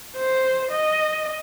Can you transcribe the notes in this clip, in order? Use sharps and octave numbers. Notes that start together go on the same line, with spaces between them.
C5
D#5